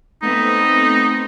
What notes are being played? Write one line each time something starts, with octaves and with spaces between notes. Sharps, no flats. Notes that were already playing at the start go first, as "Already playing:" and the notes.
A3 B3 C4 D#4